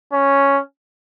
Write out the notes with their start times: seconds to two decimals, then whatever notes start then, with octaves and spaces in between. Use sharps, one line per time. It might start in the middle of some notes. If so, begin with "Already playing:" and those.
0.13 C#4